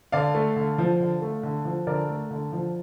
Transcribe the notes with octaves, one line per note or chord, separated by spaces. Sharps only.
D3 D5 F5
A3
D3
F3
D3
A3
D3
F3
D3 A#4 D5
A3
D3
F3